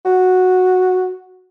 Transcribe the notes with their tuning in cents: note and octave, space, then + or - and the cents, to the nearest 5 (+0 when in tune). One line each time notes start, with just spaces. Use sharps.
F#4 -5